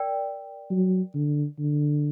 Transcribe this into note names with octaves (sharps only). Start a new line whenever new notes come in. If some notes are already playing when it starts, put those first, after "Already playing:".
Already playing: A#4 D5 G5
F#3
D3
D3